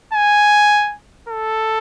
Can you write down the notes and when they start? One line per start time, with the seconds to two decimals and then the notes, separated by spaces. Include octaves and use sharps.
0.14 G#5
1.29 A4